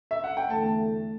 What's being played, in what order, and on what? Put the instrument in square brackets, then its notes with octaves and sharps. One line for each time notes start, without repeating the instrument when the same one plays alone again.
[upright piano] E5
F#5
G5
[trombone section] E2 D3 A3 [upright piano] A5